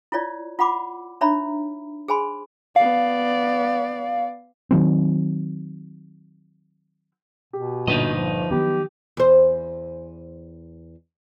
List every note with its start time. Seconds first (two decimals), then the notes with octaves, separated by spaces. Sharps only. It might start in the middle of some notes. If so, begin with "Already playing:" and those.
0.12 E4 F4 C#5 D5
0.59 F4 F#5 B5 D6
1.21 D4 D#4 C#5 E5 A#5 B5
2.08 G#4 C5 G#5 B5 C6
2.76 B3 D5 F5
4.71 D#3 F#3 C4
7.53 B2 G4
7.87 G1 A#2 D#4 B4 D#5
8.14 F3
8.51 D#3 F3 F#3 B3 G4
9.17 E2 C5